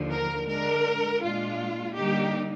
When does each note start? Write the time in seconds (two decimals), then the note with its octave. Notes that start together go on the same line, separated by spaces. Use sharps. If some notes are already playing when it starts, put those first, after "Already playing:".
Already playing: D#2 D3 F3
0.10 A#4
0.47 D3 G#3 D4 A#4
1.20 A#2 G#3 D4 F4
1.94 D3 G3 A#3 D#4 G4